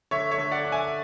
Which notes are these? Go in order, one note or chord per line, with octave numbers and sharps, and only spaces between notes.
D3 C#5 E5
C#5 E5
D3
D5 F#5
D4
E5 G#5